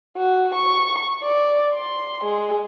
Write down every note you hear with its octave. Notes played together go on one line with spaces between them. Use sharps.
F#4
C#6
D5
C6
G#3